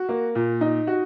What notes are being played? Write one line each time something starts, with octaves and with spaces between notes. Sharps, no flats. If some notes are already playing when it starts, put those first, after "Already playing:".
Already playing: F#4
A#3
A#2
D#4
F#4